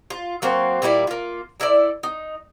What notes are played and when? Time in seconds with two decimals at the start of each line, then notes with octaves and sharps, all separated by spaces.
0.10 F4
0.42 F#3 A#3 C4 C5
0.82 A#2 G3 E4 D5
1.07 A#3 F4
1.60 D4 E4 A4 D5
2.03 D#4